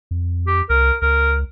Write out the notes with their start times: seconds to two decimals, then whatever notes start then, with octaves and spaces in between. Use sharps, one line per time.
0.11 F2
0.47 G4
0.70 C2 A#4
1.02 C#2 A#4